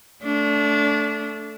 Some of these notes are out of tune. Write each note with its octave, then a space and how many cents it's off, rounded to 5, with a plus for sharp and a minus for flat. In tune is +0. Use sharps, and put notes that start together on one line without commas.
A3 +0 D4 -25